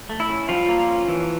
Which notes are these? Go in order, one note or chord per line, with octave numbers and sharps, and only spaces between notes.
A3
E4
C#4
F3 G3 F4
A#3
C#4
E3